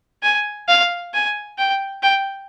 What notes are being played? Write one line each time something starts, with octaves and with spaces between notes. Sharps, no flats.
G#5
F5
G#5
G5
G5